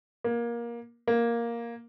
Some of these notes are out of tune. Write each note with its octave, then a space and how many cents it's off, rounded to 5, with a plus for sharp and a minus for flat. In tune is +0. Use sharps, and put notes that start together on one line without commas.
A#3 +20
A#3 +5